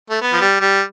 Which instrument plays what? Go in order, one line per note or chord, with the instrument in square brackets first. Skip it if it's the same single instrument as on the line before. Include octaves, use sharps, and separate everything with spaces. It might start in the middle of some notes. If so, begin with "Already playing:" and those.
[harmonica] A3
B3
F3
G3
G3